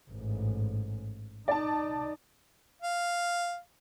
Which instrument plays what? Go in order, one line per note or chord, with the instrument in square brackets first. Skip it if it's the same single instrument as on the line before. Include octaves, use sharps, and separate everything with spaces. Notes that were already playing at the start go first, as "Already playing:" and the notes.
[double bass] A1 G#2
[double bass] D#4 [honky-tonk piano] D5 A5
[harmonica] F5